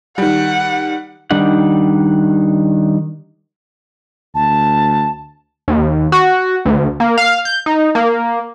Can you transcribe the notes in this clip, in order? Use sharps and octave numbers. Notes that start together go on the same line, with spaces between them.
D#3 G3 F#5
D#3 G3 D4 D#4 F#5
D2 A5
D#2
F#4
D2
A#3
F5
G6
D#4
A#3